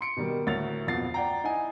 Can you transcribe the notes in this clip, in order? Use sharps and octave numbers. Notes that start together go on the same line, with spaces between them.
C6 C#7 D7
B2 D#3 G3 A#3
D2 A2 A#3 C#5 A6 F7
A#1 F2 B2 B3 A6 C7
D5 F#5 G5 A#5
D#4 E4 F#5 G#5